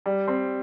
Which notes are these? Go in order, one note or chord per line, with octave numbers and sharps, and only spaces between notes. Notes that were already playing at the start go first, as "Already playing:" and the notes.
G3
C4